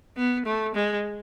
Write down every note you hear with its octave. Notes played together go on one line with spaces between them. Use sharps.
B3
A3
G#3